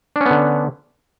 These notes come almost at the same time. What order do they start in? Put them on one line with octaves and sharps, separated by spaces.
D4 C#4 B3 D3